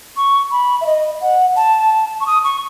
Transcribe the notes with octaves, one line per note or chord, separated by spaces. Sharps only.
C#6
B5
E5
D#5
F#5
A5
C#6
D#6
C#6